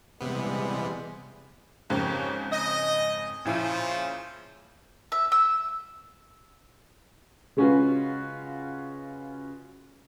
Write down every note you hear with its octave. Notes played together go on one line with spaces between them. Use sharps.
C3 E3 G3 G#3 B3
F2 G#2 C#3 A#3 G4 C#5
D#5
A#2 C#3 F3 E4
E5
E6
C#3 G#3 C#4 F4 F#4 B4